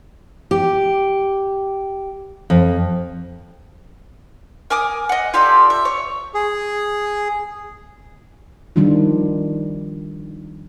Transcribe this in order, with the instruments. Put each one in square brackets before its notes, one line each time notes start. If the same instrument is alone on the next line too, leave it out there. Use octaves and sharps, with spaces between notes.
[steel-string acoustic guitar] G4
F2
[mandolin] A#4 G#5 D6 D#6
D#5 F#5
F4 G4 A4 D5
E5
C#5
[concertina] G#4
[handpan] D#3 F3 G3 D4 F4